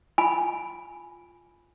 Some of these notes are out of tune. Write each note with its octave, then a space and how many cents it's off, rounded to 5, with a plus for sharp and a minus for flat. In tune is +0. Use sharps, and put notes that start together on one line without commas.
F4 +0 G#5 +0 B5 +0